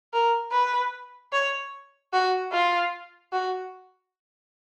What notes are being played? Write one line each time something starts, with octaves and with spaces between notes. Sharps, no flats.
A#4
B4
C#5
F#4
F4
F#4